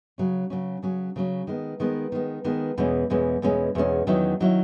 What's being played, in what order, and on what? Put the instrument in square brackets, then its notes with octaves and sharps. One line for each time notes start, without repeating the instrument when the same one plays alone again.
[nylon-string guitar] C#3 F#3 C#4
C#3 F#3 C#4
C#3 F#3 C#4
C#3 F#3 C#4
D#3 G#3 B3
D#3 G#3 B3
D#3 G#3 B3
D#3 G#3 B3
E2 B2 G#3 C#4
E2 B2 G#3 C#4
E2 B2 G#3 C#4
E2 B2 G#3 C#4
E2 D#3 F#3 C#4 E4
D#3 F#3 C#4 E4